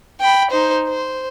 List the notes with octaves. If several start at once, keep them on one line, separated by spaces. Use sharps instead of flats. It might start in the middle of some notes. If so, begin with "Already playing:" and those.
G5 B5
D#4 C5
C5